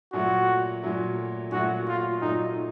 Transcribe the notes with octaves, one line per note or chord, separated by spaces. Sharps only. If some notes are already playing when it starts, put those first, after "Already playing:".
A#2 F#3 A3 F#4
A#2 F#3 A3
A#2 F#3 A3 F#4
F4
A#2 F#3 A3 D#4